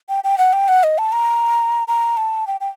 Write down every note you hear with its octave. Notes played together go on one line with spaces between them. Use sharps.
G5
G5
F#5
G5
F#5
D#5
A5
A#5
A#5
A5
G5
G5